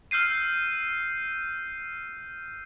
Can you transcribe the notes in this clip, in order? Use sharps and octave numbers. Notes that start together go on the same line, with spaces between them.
E6 F6 G6 C7 D#7